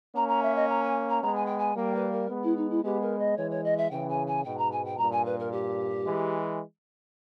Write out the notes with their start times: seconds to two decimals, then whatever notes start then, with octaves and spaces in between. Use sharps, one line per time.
0.14 A#3 C#4 A#5
0.28 A#5
0.42 E5
0.55 D#5
0.69 A#5
0.83 G#5
1.09 A#5
1.22 G#3 B3 A#5
1.35 G#5
1.45 G5
1.58 G#5
1.76 G3 A#3 G5
1.94 B4
2.12 A#4
2.29 G#3 B3
2.43 E4
2.56 D#4
2.70 E4
2.83 G#3 B3 G4
3.01 A#4
3.18 D#5
3.37 E3 G#3 C#5
3.50 C#5
3.64 D#5
3.77 E5
3.91 C#3 E3 G5
4.09 G#5
4.26 G#5
4.44 G#2 B2 G5
4.58 A#5
4.71 G#5
4.84 G5
4.97 G2 A#2 A#5
5.11 G#5
5.25 B4
5.39 A#4
5.52 G4
6.05 E3 G#3